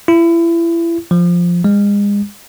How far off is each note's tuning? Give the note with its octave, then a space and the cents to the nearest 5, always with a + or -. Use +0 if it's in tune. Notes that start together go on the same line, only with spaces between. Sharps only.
E4 +30
F3 +0
G#3 -35